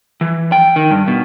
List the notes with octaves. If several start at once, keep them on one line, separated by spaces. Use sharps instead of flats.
E3
G5
D#3
G2
B2